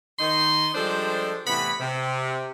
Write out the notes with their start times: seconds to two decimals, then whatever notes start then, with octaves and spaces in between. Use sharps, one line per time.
0.19 D#3 D#4 C6
0.74 F3 G3 G#3 D4 A4 C5
1.46 A2 C3 E3 B3 B5
1.80 C3